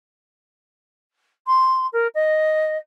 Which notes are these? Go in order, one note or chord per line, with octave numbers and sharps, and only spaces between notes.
C6
A#4
D#5